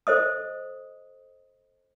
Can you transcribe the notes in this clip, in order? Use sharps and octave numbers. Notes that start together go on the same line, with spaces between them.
A4 C5 D#5 D#6